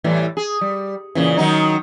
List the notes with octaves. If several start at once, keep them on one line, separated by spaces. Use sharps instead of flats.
A2 E3 G3
G#4
G3
A#2 C#3 E3
D#3 F#3 D#4